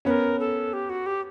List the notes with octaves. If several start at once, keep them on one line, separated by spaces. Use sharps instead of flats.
B3 C#4 A#4 B4
A4
G4
F#4
G4